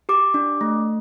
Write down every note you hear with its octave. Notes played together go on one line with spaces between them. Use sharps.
G4 D6
D4
A3